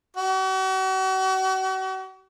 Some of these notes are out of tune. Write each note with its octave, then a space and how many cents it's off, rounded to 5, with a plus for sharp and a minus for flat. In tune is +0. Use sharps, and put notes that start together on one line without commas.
F#4 +40